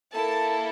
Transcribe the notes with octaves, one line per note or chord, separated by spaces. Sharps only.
A#3 E4 A4 A5